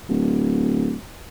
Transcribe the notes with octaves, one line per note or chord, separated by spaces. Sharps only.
D1